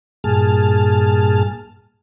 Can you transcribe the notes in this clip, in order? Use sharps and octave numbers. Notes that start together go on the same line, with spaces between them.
G2 A#2 G#4 A5 F6